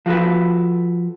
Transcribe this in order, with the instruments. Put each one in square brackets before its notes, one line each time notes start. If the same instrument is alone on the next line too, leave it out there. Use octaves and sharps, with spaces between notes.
[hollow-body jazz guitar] F3 F#4 A4 B4